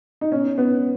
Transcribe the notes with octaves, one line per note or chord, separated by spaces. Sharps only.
D#4
B2 C#4
B3